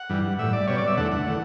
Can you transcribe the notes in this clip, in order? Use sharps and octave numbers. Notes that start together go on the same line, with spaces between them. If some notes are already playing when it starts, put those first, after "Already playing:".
Already playing: F#5
G2 E3 G3
A2 G3 E5
D5
B2 G3 C#5
D5
E5
E2 D3 A3 F#5
F#5
E3 A3